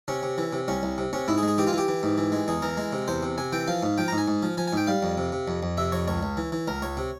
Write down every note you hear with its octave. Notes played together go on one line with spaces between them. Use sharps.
C3 C#4
C3
E3
C3
C2 C#4
C2
C3
C3 C#4
G#2 E4
G#4
G#3
G#4
E3 G4
F4
E3 G4
E3
G#2
E3
G#3
E2 G#4
E3 A#4
G#3
C3
E2 C5
C3
C3 G#5
E3 G5
F3 F5
G#2
F3 G5
G#2 A#5
G#5
G#2
F3
F3 G#5
G#5
G#2 G5
G3 F5
F2
C3
C3
F2
F2
C3 E5
F2 C#5
C#2 C#5
C#2
E3
E3
C#2 A#4
C#2 C#5
C3